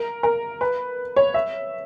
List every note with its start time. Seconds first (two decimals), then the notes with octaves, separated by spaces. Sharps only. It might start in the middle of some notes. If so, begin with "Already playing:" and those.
Already playing: A#4
0.23 A#4
0.61 B4
1.16 C#5
1.34 E5